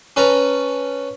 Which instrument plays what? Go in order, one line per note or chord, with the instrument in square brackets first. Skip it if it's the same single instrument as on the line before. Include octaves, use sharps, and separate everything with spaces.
[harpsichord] C#4 B4 A5 A#5